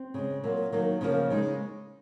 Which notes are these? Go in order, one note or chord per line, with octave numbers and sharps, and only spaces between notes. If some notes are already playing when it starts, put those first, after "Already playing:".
Already playing: C4
C#3 G#3
A#2 F#3 A#3
D#3 F#3 A#3
C#3 F3 A#3 C#4
C#3 G#3 D#4